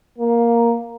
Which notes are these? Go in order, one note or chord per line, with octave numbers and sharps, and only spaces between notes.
A#3